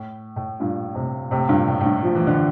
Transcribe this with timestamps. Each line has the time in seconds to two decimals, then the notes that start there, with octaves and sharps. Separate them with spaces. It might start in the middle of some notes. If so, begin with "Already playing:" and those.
Already playing: A2
0.36 A2
0.60 G2 A#2
0.95 A2 C3
1.31 A2 C3
1.49 G2 A#2
1.68 A2
1.81 A2
1.85 G2
2.03 F3
2.15 E3
2.27 D3